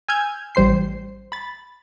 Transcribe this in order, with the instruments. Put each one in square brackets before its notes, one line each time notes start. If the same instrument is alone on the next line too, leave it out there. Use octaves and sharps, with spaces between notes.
[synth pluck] G#5 E6 F6 G6 G#6
A1 G3 C5 C6 C7
B5 A6